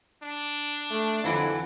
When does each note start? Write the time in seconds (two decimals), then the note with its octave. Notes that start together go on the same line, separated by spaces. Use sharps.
0.23 D4
0.91 A3
1.24 F2 D3 E3 F#3